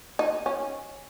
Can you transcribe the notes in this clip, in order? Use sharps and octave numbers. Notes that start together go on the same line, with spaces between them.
D#4
C#4